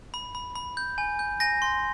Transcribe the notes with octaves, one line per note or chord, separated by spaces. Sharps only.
B5
B5
B5
G6
G#5
G6
G#5 A#6
C6